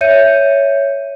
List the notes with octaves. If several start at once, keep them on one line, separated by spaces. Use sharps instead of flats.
C#5 E5 G6 C#7 D#7